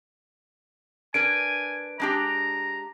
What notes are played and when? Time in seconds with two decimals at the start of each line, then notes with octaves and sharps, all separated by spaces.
1.14 D4 A#4 B4 G#5 D7
2.00 G#3 D4 G4 A#5